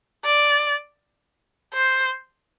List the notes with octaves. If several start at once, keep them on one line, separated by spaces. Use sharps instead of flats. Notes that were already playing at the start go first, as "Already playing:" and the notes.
D5
C5